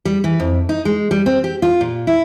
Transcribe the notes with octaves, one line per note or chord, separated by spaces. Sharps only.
G3
E3
F2
D#4
G#3
G3
C4
G4
F4
A#2
E4